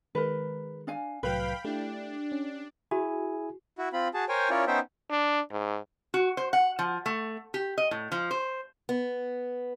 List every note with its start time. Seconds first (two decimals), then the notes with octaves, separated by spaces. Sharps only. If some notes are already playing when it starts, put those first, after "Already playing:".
0.15 D#3 G#3 A#4 B4
0.87 D4 F5 G#5
1.23 C2 A2 F#3 B4 F5 G5 B5
1.65 A3 D4 E4 G4
2.32 C#4
2.91 E4 F#4 G#4 G#5
3.78 E4 F#4
3.93 C4 F4 B5
4.14 F#4 G#4 A5
4.29 A#4 C5 C#5 G5 G#5
4.50 C#4 E4 F4 A#4 C#5 D5
4.67 B3 C#4 D#4 C5 E5 G5
5.10 D4
5.51 G#2
6.14 F#4
6.37 C5
6.53 F#5
6.79 F3
7.06 A3
7.54 G4
7.78 D#5
7.91 A2
8.12 F3
8.31 C5
8.89 B3